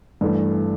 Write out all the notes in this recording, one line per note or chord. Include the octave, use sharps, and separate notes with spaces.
G2 E3 A3